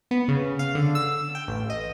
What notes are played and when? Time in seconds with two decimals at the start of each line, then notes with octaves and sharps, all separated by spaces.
0.11 B3
0.28 C#3
0.59 F5
0.75 D3
0.95 E6
1.35 G5
1.48 A1
1.70 D#5